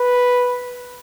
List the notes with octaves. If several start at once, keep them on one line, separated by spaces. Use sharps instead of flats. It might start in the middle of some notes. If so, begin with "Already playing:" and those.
Already playing: B4